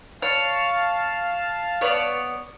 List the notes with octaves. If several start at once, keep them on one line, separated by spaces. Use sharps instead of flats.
C#5 F5 A5
B3 C#5 D5